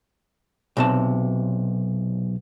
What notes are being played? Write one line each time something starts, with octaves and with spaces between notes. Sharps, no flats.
B1 C3 A5